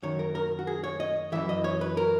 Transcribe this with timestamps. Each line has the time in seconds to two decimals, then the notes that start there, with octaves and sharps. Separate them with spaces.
0.03 F#2 D#3 C#5
0.19 A#4
0.35 A#4
0.59 F#4
0.67 G#4
0.84 C#5
1.00 D#5
1.32 F#2 E3 E5
1.49 D#5
1.64 C#5
1.81 B4
1.97 A#4